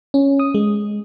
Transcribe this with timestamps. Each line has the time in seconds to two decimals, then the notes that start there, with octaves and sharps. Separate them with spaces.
0.14 C#4
0.39 D#6
0.54 G#3